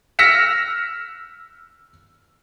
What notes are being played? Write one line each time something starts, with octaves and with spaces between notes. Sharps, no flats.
E6 F6 A#6 B6 C#7 E7